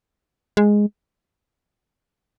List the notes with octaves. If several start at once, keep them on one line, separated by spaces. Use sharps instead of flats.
G#3